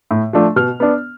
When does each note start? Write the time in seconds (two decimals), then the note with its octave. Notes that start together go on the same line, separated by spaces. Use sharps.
0.11 A2
0.33 F3 A3 D4
0.56 B2 F6
0.80 B3 D4